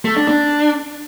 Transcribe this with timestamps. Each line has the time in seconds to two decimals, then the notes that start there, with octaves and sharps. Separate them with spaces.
0.05 A3
0.17 D4
0.28 D4